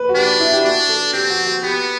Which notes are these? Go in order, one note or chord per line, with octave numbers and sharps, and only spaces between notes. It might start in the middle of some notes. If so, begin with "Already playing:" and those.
Already playing: B4
F#4
D4 G4
E4
G4
D4 F#4
A4
C4 G4
F#4
F#4
B3 G4